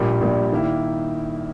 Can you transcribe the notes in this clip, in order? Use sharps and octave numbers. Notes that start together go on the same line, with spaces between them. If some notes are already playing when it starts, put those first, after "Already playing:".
Already playing: A#1 A#2 G3
A#1 A#2 G3
D#3 A#3 E4